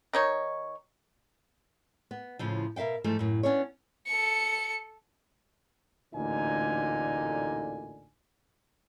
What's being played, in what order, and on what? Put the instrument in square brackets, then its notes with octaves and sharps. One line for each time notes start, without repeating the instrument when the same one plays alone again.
[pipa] D#3 D#4 C#5
[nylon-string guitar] B3
A2 C#3 F3
B2 A#4 E5 F5 G5
G#2 E3 F3 A3
F#2 A2
B3 C#4 D4 A#4 C#5
[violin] A4 C#7
[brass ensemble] A1 D2 A#2 D3 D#4 G#5